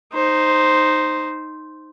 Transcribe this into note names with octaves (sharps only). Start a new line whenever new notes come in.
D#4 C5